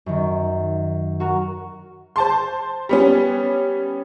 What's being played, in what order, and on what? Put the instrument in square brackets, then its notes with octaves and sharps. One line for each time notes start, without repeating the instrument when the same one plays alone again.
[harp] F#2 D#3
F#4 A#4
[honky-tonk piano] C5 A5 C6
G3 B3 C#4